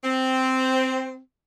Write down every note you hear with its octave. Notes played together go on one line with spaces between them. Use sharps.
C4